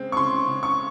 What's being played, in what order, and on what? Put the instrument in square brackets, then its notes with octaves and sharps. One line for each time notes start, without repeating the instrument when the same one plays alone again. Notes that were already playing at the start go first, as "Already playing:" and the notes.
Already playing: [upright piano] C#3 G#3 C4
C#6
C#3 C6
C#3
C#6